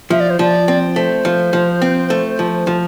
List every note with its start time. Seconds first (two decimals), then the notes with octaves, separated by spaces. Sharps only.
0.10 F3 E5
0.20 D5
0.30 C5
0.39 F3 D5
0.68 C4
0.96 A3 C5
1.25 F3
1.53 F3
1.82 C4
2.10 A3
2.39 F3
2.67 F3